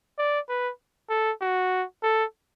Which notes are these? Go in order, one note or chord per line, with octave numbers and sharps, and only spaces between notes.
D5
B4
A4
F#4
A4